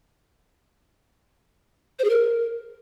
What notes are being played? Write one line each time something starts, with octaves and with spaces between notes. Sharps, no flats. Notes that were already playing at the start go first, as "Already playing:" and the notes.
C5
G#4
A#4